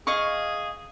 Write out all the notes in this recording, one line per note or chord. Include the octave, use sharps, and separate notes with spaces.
G#4 D#5 F5 C#6